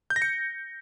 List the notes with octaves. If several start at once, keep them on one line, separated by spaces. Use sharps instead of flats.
G6
A#6
C#7